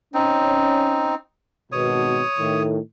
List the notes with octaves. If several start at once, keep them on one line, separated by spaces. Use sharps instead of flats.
C4 C#4 D#4
G#1 B2 C#5 D#6
A2 D#3